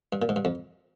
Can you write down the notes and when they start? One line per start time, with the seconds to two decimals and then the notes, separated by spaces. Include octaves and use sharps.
0.13 G2
0.22 A#2
0.29 G#2
0.36 G2
0.45 F2